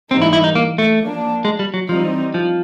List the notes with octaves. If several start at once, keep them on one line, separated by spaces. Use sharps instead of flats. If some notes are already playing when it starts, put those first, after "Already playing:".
G#2 E3 G3 A#3 C4 D#4
E4
E4
D#4
A#3
A3
F3 A#3 D4
G#3
G3
F#3
E3 F3 G3 C4 D#4
F3